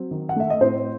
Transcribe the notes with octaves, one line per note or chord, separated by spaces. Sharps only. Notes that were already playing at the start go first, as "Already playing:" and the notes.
Already playing: F#3 C4
D#3
F#5
A3 E5
D#5
A2 C4 C5